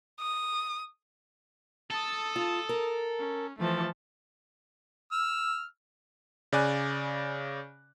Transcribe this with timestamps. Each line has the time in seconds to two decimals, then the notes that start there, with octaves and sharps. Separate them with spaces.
0.20 D#6
1.90 A4 A5 D#6
2.36 F4
2.69 A#4
3.19 C#4
3.59 E3 F3 A3 A4
5.12 E6 F6
6.52 C#3 D5 G#5 F#6